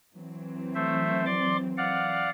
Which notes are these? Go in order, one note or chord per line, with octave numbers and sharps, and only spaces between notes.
E3 F#3 C4
A3 C5 E5
D5 C6 D6
D5 F5 F#5